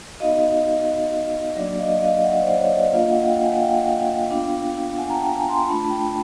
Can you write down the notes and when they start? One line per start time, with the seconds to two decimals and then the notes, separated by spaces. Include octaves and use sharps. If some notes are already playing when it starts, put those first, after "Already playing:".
0.20 B3 D#4 F#4 D#5 F5
1.56 F#3 A#3 D4 F#4 D5 E5
1.78 D#5 F5
2.02 D#5 F5
2.24 E5 F#5
2.41 C5 D5
2.59 C#5 D#5
2.72 D#5
2.76 D5 E5
2.92 A#3 D4 F4 D#5 F5
3.09 E5 F#5
3.27 F5 G5
3.44 F#5 G#5
3.61 F5 G5
4.29 B3 D4 F4
4.97 F#5 G#5
5.10 A#5
5.14 G5 A5
5.32 G#5 A#5
5.48 A#5 C6
5.66 A3 D4 F4 A5 B5
5.89 G5 A5